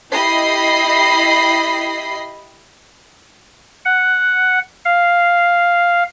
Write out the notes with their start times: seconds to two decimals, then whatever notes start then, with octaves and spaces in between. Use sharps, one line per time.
0.12 E4 G4 D#5 B5 C7
3.85 F#5
4.85 F5